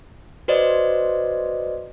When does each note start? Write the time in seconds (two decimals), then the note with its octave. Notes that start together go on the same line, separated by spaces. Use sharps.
0.48 F#4 B4 C5 D5 D#5